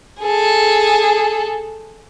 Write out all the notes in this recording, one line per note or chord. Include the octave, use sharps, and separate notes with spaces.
G#4 A4